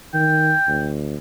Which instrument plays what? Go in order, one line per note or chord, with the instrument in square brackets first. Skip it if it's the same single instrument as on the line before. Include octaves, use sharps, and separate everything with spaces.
[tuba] D#3 [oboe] G5
[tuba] D2